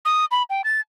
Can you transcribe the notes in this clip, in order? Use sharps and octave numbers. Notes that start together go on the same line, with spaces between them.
D#6
B5
G5
A6